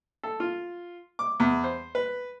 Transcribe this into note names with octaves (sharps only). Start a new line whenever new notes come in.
A4
F4
D6
E2
C5
B4